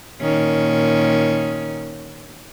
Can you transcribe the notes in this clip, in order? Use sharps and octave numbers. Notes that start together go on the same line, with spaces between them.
A#2 D#3 C#4